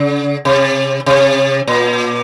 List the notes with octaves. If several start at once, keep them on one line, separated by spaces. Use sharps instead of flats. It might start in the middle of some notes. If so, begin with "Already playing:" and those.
Already playing: C#3
C3
C3
A#2